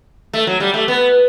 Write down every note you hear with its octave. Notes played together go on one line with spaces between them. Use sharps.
A3
F#3
G3
A3
B3